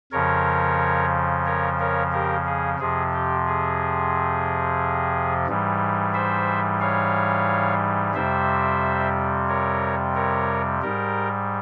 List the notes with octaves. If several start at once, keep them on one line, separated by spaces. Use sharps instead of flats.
F2 C#3 F3 A#4 C#5
A#4 C#5
A#4 C#5
G4 A#4
G#4
F2 C3 F3 G#4
G4
G#4
G#2 E3 G3
C5 E5
C#5 F5
F2 C3 G3 C5 E5
A#4 C#5
A#4 C#5
G#2 G3 G4 A#4